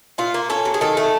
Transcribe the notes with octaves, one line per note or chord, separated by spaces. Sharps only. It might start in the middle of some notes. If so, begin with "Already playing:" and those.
A#2 F4
A#3
C#4 A4
F#3
G#4
D#3 A4
A3